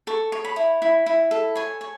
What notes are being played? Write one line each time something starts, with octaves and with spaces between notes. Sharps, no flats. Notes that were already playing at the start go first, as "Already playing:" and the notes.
A4 C#6
C#5
B5
E4
E4
E4
A4
C#5 G#5
C#5